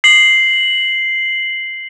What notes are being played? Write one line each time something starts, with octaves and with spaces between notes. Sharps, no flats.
C7 F#7